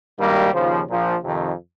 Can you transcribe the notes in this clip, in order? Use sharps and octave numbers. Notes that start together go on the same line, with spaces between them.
G#1 G2 D#3 G3 A#3
D#2 C#3 F3
A#1 A#2 F3
F2 C3 D#3